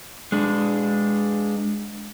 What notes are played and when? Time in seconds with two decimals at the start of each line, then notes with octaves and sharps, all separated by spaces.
0.32 G#3 D4